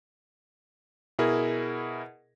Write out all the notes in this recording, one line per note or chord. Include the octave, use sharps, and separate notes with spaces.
B2 E4 G#4 A#4